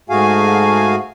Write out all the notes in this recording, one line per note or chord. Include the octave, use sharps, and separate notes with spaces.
G#2 A3 F#4 G#4 F5 G#5